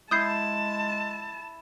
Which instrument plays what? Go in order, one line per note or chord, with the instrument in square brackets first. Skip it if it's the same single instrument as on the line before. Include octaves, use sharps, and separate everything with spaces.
[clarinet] G#3 [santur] E4 [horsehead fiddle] A5 [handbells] D#6 G6 C7